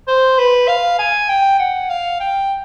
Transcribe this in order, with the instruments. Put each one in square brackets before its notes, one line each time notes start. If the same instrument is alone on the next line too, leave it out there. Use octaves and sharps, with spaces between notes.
[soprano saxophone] C5
B4
F5
G#5
G5
F#5
F5
G5